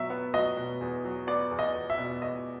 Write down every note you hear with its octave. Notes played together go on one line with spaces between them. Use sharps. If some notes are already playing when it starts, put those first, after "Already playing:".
Already playing: B2 F#3 B3 E5
B3
F#3 D#5
B2
E2
F#3
B3 D5
E2
D#5
E2
E5
B2
E2 D#5